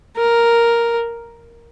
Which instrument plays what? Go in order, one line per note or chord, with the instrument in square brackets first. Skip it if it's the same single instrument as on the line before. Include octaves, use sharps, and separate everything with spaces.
[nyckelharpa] A#4